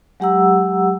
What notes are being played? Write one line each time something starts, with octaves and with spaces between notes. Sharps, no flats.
F#3 G#3 G4 F#5 A#5 E6